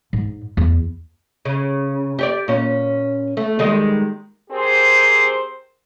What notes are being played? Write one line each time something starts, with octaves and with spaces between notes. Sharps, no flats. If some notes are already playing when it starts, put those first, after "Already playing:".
G#2
E2 E4
C#3
G4 C#5 D5
A#2 C#4
A3
D#3 G3 G#3
C4 G4 G#4 A#4 C5